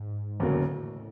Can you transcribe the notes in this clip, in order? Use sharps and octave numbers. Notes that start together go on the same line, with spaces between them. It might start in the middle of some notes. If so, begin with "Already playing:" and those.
Already playing: G#2
E1 D2 A2 C#3 F#3 A#3